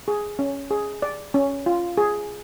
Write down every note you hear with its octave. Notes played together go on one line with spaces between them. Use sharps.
G#4
C#4
G#4
D5
C#4
F4
G#4